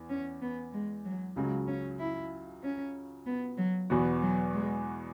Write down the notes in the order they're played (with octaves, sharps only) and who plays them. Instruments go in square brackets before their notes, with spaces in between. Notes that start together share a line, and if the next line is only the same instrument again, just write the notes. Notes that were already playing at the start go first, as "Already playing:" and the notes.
Already playing: [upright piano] E2
[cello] C#4
B3
G#3
F#3
[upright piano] C#2 C#3 F#3 [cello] G#3
[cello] C#4
E4
C#4
B3
F#3
[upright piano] E2 B2 B3 F#4 [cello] E3
[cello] F#3
G#3